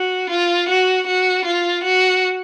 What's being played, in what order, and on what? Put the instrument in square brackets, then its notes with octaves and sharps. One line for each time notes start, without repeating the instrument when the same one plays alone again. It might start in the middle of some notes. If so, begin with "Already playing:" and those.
Already playing: [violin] F#4
F4
F#4
F#4
F4
F#4